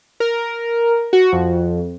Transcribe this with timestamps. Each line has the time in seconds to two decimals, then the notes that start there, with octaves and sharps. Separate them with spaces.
0.20 A#4
1.13 F#4
1.32 F2